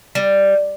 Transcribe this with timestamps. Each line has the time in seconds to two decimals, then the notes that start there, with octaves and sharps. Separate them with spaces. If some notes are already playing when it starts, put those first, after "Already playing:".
0.15 G3